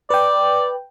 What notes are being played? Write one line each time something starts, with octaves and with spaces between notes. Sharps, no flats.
B4 D5 G5